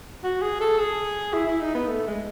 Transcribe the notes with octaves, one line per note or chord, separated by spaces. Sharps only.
F#4
G#4
A4
G#4
E4
E4
D#4
B3
A3
G#3